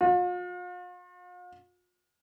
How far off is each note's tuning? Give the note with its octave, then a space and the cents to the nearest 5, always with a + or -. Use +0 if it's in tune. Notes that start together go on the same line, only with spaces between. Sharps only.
F4 +45